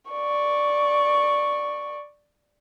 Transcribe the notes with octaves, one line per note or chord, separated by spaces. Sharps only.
D5 C#6